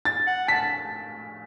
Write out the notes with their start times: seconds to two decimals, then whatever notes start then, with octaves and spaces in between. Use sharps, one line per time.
0.05 A6
0.27 F#5
0.48 A5 B6